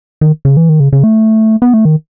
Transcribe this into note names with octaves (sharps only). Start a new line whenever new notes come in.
D#3
C#3
E3
D#3
C#3
C#3
A3
B3
A3
D#3